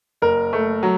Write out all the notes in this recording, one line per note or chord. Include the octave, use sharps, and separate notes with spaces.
F#1 A#4
A3
F#3